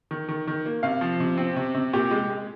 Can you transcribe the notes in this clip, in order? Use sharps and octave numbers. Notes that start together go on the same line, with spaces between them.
D#3
D#3
D#3
A#3
C3 F5
F3
C3
C4
C3
C3
A#2 G4
G#3
G#3